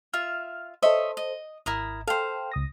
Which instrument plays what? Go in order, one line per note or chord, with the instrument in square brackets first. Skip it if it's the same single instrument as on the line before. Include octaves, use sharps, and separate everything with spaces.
[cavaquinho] F4 E5 [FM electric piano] F6
[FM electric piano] A4 C5 [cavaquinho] C#5 D#5 E5
[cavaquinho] D#5
[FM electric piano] G#1 [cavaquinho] E4 A#4 D#6
[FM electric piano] A4 G5 [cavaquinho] C5 F5
[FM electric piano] C#2 D#6 A#6